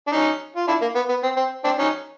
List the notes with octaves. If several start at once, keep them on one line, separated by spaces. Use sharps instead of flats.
D4
C#4 D#4
F4
D4 E4
A#3
B3
B3
C4
C4
C4 D4
C#4 D#4